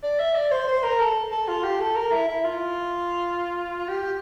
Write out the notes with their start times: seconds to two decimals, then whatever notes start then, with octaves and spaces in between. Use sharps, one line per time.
0.03 D5
0.20 E5
0.35 D5
0.52 C5
0.68 C5
0.84 A#4
1.00 A4
1.32 A4
1.48 F4
1.64 G4
1.80 A4
1.96 A#4
2.12 E4
2.28 E4
2.44 F4
3.89 G4